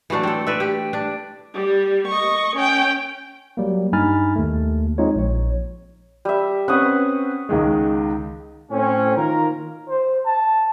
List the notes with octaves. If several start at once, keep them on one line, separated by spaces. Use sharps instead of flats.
E3 F#3 A3 D4
C4 A4
B4 D5 E5
G4
D4
G3
D#5 C#6
C#4 G5
F#3 G3 A#3
G2 D#4 G#5 B5 F6 A6
D#2 A3
G#3 C4 D#4 F4 C#5
A#1 C#5
G3 E5
C4 C#4 B4 F#5 C#6 D#6
C#2 D#3 G#3
A2 C4 C#4
D#3 A#3 F4 A#4
C5
A5